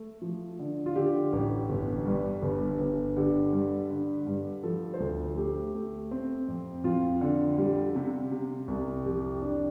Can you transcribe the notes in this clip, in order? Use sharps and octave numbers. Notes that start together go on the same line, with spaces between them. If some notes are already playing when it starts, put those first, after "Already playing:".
Already playing: A3
F3
D3
F4
D3 G4
A1
G1
G2
G1
G1
D3 G4
G2
D3
G2
F3 A4
C5
D2 A4
A3 G4
A3
C4
F2
F2 F4
D3
G3
C3
C3
C2
F2 G4
D4